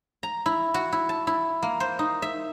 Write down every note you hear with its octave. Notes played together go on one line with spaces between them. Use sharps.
A#5
E4
F#4
E4
A5
E4
A#3
C5
D#4
E5